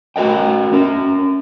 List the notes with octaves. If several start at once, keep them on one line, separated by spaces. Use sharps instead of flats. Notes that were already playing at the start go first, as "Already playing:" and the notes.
F#4 A#4 D#5 G5
C#4 A#4